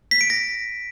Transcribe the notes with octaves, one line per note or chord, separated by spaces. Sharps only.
B6
D7
A#6